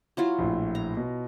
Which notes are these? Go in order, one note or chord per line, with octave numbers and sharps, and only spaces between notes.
F#3 E4 F4
A#1 A2
A#5
B2